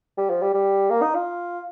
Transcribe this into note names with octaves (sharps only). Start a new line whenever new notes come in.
G3
F3
G3
G3
A#3
D#4
F4